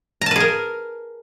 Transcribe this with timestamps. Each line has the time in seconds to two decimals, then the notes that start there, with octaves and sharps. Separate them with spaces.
0.21 A#5
0.26 A5
0.31 B4
0.36 G#4
0.40 A#4